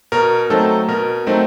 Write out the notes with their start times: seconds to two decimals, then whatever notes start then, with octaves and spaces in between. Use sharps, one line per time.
0.12 B2 A#4
0.50 F#3 A3 C4 D#4 A4
0.88 B2 A#4
1.27 F#3 A3 C4 D#4